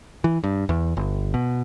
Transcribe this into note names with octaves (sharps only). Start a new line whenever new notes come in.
E3
G2
E2
G1
B2